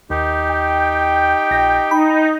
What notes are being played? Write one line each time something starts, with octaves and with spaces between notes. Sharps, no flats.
D#2 D#4 G4
G5
A#1 A#6
D#4 B5